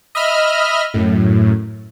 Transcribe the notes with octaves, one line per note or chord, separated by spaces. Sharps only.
D#5 E5 B5 F6
F#2 A2